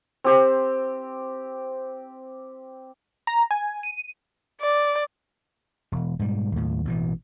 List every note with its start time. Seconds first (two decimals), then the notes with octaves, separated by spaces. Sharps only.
0.24 C4 G4
3.27 A#5
3.51 G#5
3.83 D#7
4.61 D5
5.92 E1
6.19 G#2 B2 G3
6.52 D#2 A2
6.85 A1 B2 E3